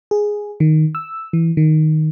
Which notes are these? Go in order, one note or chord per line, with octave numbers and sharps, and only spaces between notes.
G#4
D#3
E6
E3
D#3